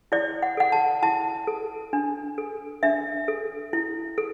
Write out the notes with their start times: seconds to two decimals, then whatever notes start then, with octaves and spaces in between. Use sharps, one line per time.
0.12 E4 D5
0.42 F#5
0.57 A4 F#5
0.72 A5
1.02 E4 A5
1.47 A4
1.93 D4
2.38 A4
2.83 D4 E5
3.28 A4
3.73 E4
4.18 A4